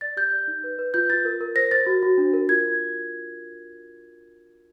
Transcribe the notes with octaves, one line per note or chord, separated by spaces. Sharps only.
D5 A6
G4 G6
D5
D#4
B4
B4
F4 G6
F4 A6
A#4
A#4
C5 A#6
C5 A6
F#4
F#4
D4
A#4
F4 G#6